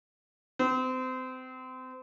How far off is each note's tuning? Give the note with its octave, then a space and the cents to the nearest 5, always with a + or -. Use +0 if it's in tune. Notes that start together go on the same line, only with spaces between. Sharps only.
C4 -30